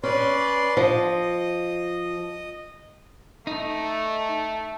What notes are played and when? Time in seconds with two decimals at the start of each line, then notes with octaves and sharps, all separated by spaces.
0.03 C#4 B4 D5 C6
0.77 F3 D#5
3.47 A3 D#4